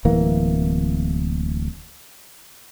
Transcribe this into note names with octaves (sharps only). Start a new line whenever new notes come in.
D1 E3 A#3